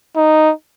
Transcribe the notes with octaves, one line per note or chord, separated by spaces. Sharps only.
D#4